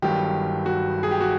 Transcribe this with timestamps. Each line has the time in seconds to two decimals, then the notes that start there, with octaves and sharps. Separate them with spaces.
0.02 G1 G2 D#3 F#3 G4
0.66 F#4
1.03 G#4
1.11 G4
1.21 F#4